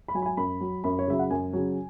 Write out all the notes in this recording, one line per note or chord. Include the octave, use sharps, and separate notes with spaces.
B5
F#3 G#5
B5
G#5
F#2 B5
F#3
F#2 B5
C#5
C#3 F#3 E5
F#5
F#2 G#5
C#3 F#3